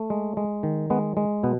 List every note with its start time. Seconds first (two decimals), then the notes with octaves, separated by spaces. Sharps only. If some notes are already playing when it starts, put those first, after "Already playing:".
Already playing: A3
0.10 G#3
0.37 G#3
0.63 D#3
0.90 G#3 B3
1.17 G#3
1.43 B2 B3